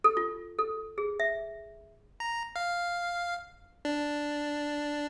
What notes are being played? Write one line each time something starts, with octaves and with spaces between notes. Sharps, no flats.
A4
F4
A4
G#4
E5
A#5
F5
D4